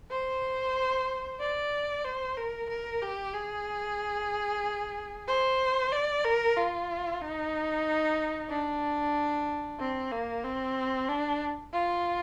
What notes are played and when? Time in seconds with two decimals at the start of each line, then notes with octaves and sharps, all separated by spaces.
0.10 C5
1.40 D5
2.04 C5
2.37 A#4
2.69 A#4
3.02 G4
3.33 G#4
5.27 C5
5.92 D5
6.24 A#4
6.57 F4
7.21 D#4
8.50 D4
9.79 C4
10.12 A#3
10.44 C4
11.08 D4
11.73 F4